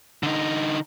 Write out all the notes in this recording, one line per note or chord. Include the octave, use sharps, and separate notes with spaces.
D3 D#4